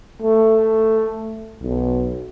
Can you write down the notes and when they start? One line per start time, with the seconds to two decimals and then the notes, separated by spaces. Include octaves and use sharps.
0.22 A3
1.63 B1